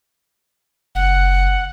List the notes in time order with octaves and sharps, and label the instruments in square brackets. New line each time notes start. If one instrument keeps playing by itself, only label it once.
[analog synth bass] F#1 [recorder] F#5